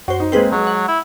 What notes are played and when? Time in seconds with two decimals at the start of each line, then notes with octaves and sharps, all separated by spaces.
0.08 F#2 F#4 C5
0.20 D#4
0.32 G#3 A#3 C4 G#4 B4 C5
0.52 F#3 G#3
0.67 F#5
0.88 E4